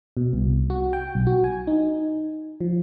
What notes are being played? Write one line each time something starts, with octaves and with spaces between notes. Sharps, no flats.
B2
C2
F#4
G5
B1
F#4
G#5
D#4
F3